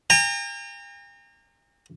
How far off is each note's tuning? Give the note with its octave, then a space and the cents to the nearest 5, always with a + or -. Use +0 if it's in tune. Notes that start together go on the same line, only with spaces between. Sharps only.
G5 +45 A#5 -25